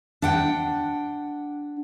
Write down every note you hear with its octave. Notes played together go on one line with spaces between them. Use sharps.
D4 F#5 G5